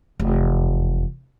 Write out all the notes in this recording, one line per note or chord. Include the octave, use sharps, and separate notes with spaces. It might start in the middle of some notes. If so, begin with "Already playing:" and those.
F1 E2